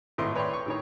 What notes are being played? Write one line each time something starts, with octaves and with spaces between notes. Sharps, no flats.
G#1 A2 A3 E4 B4 C6
B4 C#5 D5 G5 C6
C#6
A2 D#3 C#5